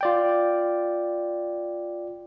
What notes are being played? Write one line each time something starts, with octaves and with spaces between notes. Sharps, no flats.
F4 D5 G5